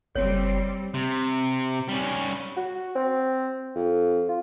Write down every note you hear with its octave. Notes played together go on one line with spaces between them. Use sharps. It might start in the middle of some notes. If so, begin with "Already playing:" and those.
F#1 G3 C4 C#5
C3
G3 C#4
F#4
C4
F2
F4